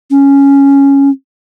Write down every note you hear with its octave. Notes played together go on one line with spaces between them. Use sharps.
C#4